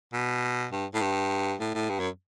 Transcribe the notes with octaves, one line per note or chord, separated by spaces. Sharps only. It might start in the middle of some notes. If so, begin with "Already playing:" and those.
B2
G2
A2
G2
A2
A2
G2
F#2